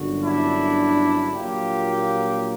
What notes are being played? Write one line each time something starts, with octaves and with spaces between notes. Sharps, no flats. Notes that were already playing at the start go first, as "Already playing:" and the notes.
Already playing: G1 F#2 D3 F#4
D4 E4
A#1 A#2 F#3 A#3 F4 G4